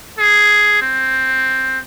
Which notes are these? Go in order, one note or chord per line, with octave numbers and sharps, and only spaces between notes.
G#4
C4